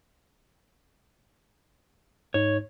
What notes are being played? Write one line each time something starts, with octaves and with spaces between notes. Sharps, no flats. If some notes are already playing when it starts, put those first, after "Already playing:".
G#2 D#4 C#5